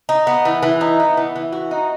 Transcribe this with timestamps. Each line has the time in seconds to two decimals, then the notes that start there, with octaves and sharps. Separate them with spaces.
0.09 D#4
0.27 B3
0.45 E3
0.63 E3
0.81 D#4
1.00 B3
1.17 E3
1.36 E3
1.53 F#4
1.71 D#4